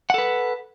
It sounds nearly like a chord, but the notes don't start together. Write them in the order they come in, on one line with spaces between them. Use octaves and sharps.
F#5 A4 B4